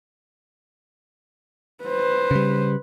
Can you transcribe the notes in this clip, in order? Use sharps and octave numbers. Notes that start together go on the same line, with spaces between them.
B4 C5
C#3 G3